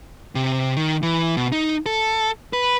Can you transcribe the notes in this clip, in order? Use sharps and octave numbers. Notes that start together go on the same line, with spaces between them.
C3
D#3
E3
B2
D#4
A4
B4